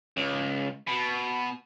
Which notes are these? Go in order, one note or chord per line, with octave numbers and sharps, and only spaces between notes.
C#2
B2